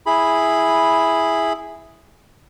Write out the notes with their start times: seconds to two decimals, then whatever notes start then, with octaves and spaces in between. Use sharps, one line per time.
0.06 E4 G#4 B5